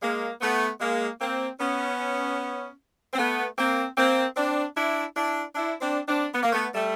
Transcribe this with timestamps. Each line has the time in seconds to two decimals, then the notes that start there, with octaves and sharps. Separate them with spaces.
0.02 G#3 A#3
0.41 A3 B3
0.81 G#3 A#3
1.20 A#3 C4
1.60 B3 C#4
3.13 C4
3.18 A3 B3
3.58 A#3 C4
3.97 A#3 C4
4.36 C4 D4
4.77 D4 E4
5.16 D4 E4
5.55 D4 E4
5.81 C4 D4
6.08 C4 D4
6.34 B3
6.43 A#3
6.53 A3 B3
6.74 G3 A3